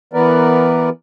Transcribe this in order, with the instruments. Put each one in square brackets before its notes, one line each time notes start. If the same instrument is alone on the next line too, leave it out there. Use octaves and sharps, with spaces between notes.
[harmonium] E3 B3 A#4 B4 D5